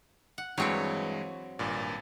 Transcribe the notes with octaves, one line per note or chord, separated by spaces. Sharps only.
F#5
G2 E3 F#3 G#3 C4 C#5
G#1 G2 A#2